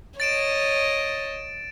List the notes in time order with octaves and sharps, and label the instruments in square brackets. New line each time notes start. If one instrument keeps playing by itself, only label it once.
[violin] C#5 D#5 [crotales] A6 D7 E7